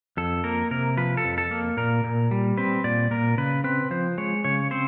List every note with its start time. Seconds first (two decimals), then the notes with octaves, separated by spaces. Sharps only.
0.17 F2 A4
0.44 A#3 A#4
0.71 C3 A#4
0.97 F3 B4
1.17 A4
1.25 F2
1.38 A4
1.51 A#3
1.77 A#2 A#4
2.04 A#2
2.31 G3
2.57 C4 B4
2.84 A#2 D5
3.11 A#2 A#4
3.38 C#3 B4
3.64 C4 B4
3.91 F3 C5
4.18 G#3 C#5
4.44 C#3 C#5
4.71 C4 C5